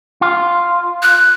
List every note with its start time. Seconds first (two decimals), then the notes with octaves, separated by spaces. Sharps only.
0.21 F4
1.02 F#6